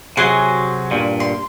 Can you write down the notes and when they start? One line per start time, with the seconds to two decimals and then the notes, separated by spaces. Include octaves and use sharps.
0.17 C3 F#3 F#4 G#4 C6
0.91 G2 A#2
1.20 C6